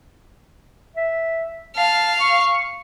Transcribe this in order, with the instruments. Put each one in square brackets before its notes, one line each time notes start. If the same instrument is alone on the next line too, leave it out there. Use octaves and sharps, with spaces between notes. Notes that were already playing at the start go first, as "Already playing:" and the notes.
[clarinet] E5
[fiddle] F5 [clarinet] A5
[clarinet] C#6